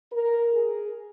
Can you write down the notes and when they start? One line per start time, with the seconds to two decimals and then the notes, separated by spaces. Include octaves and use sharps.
0.12 A#4
0.52 G#4